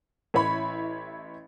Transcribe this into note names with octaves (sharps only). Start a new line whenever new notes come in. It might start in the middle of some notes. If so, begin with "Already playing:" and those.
A1 E4 C#5 B5